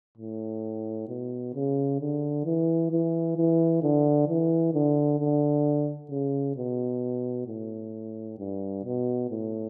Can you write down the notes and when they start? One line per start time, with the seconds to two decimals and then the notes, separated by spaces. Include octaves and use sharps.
0.18 A2
1.09 B2
1.54 C#3
2.00 D3
2.45 E3
2.92 E3
3.37 E3
3.83 D3
4.28 E3
4.74 D3
5.19 D3
6.10 C#3
6.56 B2
7.47 A2
8.39 G2
8.84 B2
9.30 A2